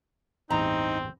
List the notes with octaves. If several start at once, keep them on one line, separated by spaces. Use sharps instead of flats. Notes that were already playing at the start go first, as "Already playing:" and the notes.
A1 E2 G2 C4 D#4 A#5